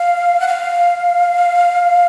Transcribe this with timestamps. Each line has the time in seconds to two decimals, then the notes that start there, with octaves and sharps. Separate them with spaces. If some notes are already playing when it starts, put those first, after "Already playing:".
Already playing: F5
0.40 F#5
0.48 F5